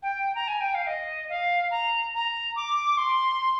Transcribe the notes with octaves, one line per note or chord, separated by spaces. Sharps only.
G5
A#5
G#5
G5
F5
D#5
F5
A#5
A#5
D6
C6